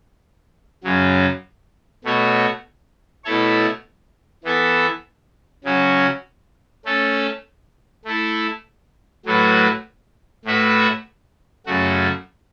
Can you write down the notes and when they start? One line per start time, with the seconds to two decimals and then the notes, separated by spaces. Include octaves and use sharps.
0.84 F#2 C#3 F#3
2.04 B2 A3 F#4 C#5
3.24 B2 A3 E4 A4 C#5
4.44 E3 B3 A4 E5
5.64 C#3 F#3 C#4 F#4
6.85 A3 C#4 A4
8.05 A3 E4 A4
9.26 A2 F#3 A3 F#4 B4
10.45 A2 A3 F#4 B4 E5
11.66 F#2 C#3 A3 F#4